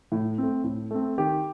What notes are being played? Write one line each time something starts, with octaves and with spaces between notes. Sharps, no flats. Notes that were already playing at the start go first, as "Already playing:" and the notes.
A2
A3 C4
A2
A3 C4
D#3 G4